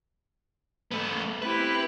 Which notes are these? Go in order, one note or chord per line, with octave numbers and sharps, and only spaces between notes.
A3 B3
C4 E4 G4 B4